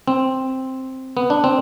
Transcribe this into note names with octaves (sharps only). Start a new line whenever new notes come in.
C4
B3
D4
C4